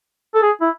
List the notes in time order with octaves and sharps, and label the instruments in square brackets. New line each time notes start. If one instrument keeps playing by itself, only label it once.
[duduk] A4
G#4
E4